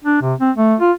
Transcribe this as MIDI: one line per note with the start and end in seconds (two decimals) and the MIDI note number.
0.04 0.19 62
0.22 0.34 48
0.41 0.51 60
0.56 0.75 57
0.80 0.92 65